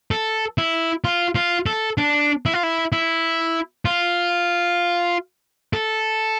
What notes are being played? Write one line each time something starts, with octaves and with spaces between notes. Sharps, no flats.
A4
E4
F4
F4
A4
D4
E4
F4
E4
E4
F4
A4